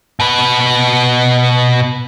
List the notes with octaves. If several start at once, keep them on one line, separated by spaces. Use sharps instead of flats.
B2 B4